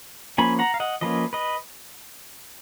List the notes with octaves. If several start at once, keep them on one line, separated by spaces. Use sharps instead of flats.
F3 A#3 C#4 G#5 B5
F#5 A#5
F5
D#5 F#5
F3 A#3 C#4 B4 D#5
B4 D#5